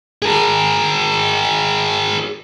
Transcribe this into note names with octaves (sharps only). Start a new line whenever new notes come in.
G#4 A#4